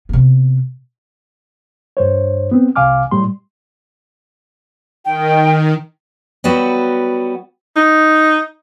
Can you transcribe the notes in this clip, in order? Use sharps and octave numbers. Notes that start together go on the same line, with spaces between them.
C3 B3
G2 C5 C#5
B3 C4
C2 C3 F5 G#5 D6 F6
A2 G3 C6
D#3 G5
F#3 G3 B3 F#4
D#4